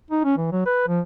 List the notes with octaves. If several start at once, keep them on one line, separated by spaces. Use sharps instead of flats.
D#4
C#4
E3
F#3
B4
F3